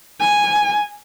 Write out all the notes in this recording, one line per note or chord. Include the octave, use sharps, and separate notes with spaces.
G#5